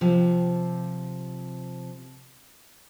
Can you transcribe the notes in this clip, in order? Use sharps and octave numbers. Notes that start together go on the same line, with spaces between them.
C3 F3